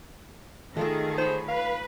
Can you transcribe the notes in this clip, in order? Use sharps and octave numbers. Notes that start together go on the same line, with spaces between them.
D#3 A3 F4 G#4 A4
C5 C#5 B5
B4 F5